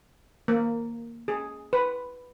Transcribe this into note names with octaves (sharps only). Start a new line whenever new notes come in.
A#3
G#4
B4